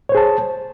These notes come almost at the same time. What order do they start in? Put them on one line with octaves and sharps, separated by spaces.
C#5 C5 G#4 A5